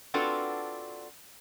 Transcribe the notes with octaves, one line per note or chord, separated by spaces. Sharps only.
C4 D4 F4 F#4 A4 B4